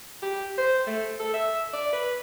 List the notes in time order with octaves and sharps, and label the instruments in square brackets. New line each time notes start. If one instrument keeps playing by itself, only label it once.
[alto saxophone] G4
C5
A3
A4
E5
D5
B4